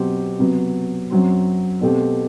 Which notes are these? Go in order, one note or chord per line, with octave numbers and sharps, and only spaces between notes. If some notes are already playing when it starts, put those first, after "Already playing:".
Already playing: B2 F#3 C4 G4
C3 F#3 B3
F#2 F#3 C4
B2 A3 C4 G4